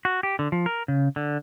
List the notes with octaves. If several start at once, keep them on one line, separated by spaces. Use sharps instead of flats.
F#4
G4
D3
F3
A#4
C#3
D3